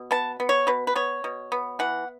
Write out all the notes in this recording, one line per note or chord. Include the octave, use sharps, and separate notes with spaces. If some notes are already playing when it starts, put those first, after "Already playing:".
Already playing: B2
B3 A5
B3
C#5
B2 B4
B4
B3 C#5
B2
B3
E3 F#5